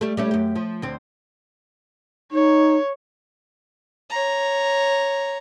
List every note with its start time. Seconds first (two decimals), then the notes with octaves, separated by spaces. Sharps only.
0.01 G3 A3
0.17 G3 A3 C#4
0.31 F#2 G4
0.56 F3
0.82 D2 C4
2.32 D#4 C#5
4.10 C#5 A#5